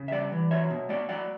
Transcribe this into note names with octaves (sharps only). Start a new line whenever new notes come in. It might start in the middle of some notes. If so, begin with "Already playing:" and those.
Already playing: C#3
E5
G3 D5 F#5
E3
F#3 C#5 E5
B2
A3 D5 F#5
F#3 D5 F#5